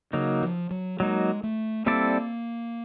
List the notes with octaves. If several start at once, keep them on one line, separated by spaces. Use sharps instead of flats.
C#3 F#3 A#3 D#4
F3
F#3
F#3 G#3 A#3 D#4
A3
G3 A#3 C4 E4 A4 D5